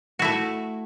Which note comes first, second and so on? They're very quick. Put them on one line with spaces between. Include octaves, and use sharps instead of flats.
F#4 E4 A3